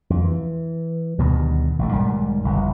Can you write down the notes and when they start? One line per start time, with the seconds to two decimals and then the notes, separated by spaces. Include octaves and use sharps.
0.10 F2
0.24 E3
1.18 D2 G2 B2 D#3
1.79 A1 A3
1.92 B1 G#2 D#3 G3
2.43 G1 C2 F2